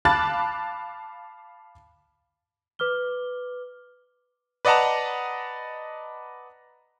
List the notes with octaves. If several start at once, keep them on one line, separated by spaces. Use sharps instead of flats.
F5 A5 B5 D6 F#6 A6
B4 D6 F6 G7
B4 D5 D#5 F#5 A5 A#5